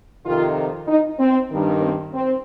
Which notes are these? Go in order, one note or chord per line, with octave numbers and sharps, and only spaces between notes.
F2 C3 D#3 F4
D#4
C4
G2 D#3
C4
C4